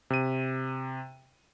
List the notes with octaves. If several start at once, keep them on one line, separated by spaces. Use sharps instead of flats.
C3 D#7